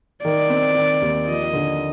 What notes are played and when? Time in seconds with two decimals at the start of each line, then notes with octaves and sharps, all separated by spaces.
0.25 D#3 D5
0.50 C4
0.76 D#3
1.02 D#2
1.27 F3 D#5
1.53 D3